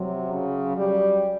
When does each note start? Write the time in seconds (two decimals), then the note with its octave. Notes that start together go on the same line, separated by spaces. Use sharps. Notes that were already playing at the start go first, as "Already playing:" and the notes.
Already playing: C3 F#3
0.31 C#3
0.77 G3